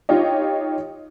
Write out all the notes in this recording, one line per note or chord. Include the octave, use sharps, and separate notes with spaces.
D#4 F4 G4 C#5 D#5